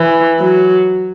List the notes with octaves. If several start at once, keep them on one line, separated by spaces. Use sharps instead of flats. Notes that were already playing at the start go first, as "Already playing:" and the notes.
Already playing: E3
F#3